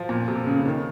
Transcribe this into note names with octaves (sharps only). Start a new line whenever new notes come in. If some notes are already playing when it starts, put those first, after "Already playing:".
Already playing: F3
A#2
C3
C#3
D#3